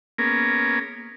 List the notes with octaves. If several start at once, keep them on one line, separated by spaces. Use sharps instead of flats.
A#3 B3 C#4 G#4 A#4